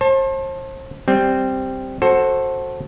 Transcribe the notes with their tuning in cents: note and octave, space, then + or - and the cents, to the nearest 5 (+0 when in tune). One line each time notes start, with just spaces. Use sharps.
C5 +40 A5 +0
G3 +0 C4 +0
F#4 +0 A4 +0 C5 +20